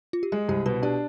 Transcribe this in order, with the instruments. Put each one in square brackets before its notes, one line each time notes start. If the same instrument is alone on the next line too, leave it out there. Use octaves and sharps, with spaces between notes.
[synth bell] F4
G4
[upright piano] G#3 [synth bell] G#4
[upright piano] C2 [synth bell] G4
[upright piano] B2 [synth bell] B4
[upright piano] D4 [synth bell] G4